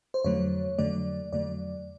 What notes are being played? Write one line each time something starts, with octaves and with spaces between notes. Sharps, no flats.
C5
F2 D3 F#3 A3 C#5
F2 D3 F#3 A3 D5
F2 D3 F#3 A3 D5